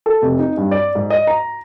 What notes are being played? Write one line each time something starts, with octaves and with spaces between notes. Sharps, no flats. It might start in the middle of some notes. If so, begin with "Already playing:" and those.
A4
F1
D#4
G2
D5
G#2
D#5
A#5